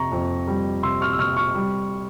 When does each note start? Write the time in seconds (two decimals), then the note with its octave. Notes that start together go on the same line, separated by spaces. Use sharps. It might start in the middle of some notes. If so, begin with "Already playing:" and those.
Already playing: F2 C3 A#5 C#6
0.12 F2
0.48 G3
0.83 C3 C6 E6
1.01 C#6 F6
1.13 E6
1.19 C3 C#6 F6
1.36 C#6 F6
1.55 G3